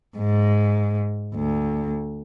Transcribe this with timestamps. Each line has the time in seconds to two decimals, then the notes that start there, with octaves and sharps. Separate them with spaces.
0.18 G#2
1.35 D2